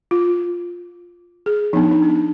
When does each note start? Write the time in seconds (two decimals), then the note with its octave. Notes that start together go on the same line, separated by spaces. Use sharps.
0.11 F4
1.46 G#4
1.73 F3 B3 D4 D#4
1.91 D#4
2.02 D4
2.09 D#4